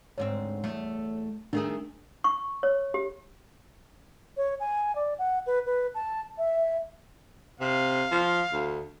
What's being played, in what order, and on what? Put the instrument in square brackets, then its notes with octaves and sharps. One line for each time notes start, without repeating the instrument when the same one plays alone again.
[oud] D2 G#2 C4 [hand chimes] C#5
[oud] E2 A3
[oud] D#3 A3 G#4 [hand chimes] D4
[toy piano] C#6
C#5
G4
[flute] C#5
G#5
D5
F#5
B4
B4
A5
E5
[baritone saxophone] C3 [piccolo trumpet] F5
[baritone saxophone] F3
D2